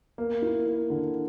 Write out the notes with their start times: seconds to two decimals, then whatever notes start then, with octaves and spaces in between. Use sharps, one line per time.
0.18 A#3
0.42 E4
0.66 A#3
0.90 D3